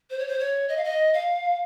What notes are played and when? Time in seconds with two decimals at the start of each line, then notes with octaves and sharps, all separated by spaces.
0.10 C5
0.19 C#5
0.28 C5
0.39 C#5
0.69 D#5
0.77 F5
0.84 D#5
1.14 F5